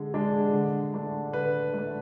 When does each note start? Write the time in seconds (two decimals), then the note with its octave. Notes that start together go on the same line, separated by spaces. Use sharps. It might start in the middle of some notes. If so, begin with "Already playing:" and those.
Already playing: D3 G#3
0.14 G#3 D4
0.53 D3
0.94 A3 D4
1.33 D3 B4
1.74 A3 D4